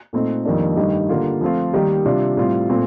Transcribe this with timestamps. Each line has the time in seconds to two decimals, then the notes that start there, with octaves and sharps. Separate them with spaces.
0.13 A#2 A3 C4 D#4
0.45 F2 D#3 G3 A#3 D4
0.77 G2 D#3 A3 D#4 G4
1.09 D3 G3 A#3 F4
1.41 F3 A3 C4 F4
1.73 D#3 G3 A#3 D#4 G4
2.05 C3 G3 D4 F4
2.37 A2 G3 C4 F4
2.69 A#2 A3 C4 F4